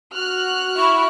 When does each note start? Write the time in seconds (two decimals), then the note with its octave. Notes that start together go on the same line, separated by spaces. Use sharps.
0.14 F#4 F6 F#6
0.77 E4 C#6